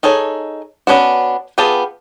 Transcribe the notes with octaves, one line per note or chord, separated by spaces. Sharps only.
D#4 G#4 A4 C#5
B3 C#4 D4 F#4
B3 F4 G4 G#4 A5